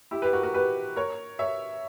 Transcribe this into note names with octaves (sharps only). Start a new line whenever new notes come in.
E4 G4
G4 B4
F#4 A#4
F#4 A#4
G4 B4
A#4 C#5
C#5 E5